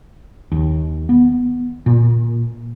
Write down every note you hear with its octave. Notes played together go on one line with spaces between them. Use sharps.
D#2
B3
A#2